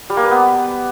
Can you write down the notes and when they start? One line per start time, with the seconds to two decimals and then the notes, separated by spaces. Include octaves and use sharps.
0.10 G3
0.17 A#3
0.24 B4
0.31 B3